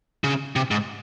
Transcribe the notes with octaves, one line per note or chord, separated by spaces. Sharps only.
C#3
C3
G#2